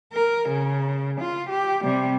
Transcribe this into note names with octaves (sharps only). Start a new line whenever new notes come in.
A#4
C#3
F4
G4
C3 G3